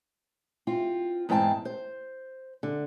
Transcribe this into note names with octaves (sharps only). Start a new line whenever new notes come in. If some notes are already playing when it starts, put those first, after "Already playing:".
C4 F4
E2 G#2 C4 G5 A5
C5
D3